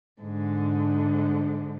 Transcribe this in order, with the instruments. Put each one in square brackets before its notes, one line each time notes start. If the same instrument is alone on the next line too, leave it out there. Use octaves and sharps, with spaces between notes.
[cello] G#2 D3